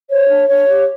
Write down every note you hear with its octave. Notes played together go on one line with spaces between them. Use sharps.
C5 C#5
D4
D4 C#5
G4